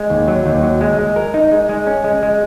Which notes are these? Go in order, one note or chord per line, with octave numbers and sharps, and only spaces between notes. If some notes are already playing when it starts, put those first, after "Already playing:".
Already playing: G#3
D#2
F#3
D#2
F#3
G#3
G#3
A#4
D#4
G#3
G#3
C#4
G#3
G#3